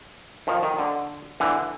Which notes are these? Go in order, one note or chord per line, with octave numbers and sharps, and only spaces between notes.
D#3 F3
D#3
D3
D3 E3